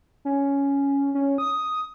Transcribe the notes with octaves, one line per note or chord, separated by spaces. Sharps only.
C#4
C#4
D#6